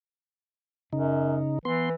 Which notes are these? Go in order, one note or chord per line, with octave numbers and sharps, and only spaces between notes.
F#2 C#3 D#4
E3 B3 C6